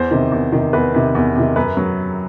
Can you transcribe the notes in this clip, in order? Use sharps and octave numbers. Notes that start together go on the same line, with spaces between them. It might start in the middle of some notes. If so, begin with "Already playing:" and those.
Already playing: E2 C5
C3 D#3
E2
C3 D#3
E2 B4
C3 D#3
E2
C3 D#3
F#2 B4
F#3